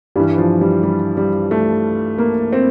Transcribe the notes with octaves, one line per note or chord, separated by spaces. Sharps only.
G2 E3 G3
F3
G3
G3
G3
A3
A#3
C4